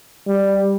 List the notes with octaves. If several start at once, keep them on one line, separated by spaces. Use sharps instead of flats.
G3